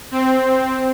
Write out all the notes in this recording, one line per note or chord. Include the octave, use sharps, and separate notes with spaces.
C4